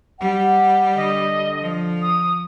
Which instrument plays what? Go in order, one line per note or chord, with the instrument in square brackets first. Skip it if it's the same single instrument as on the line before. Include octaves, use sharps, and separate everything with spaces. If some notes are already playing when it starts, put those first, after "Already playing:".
[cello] G3 [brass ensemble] F#5
[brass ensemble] D3 [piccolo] D#5
[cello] F3
[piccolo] D#6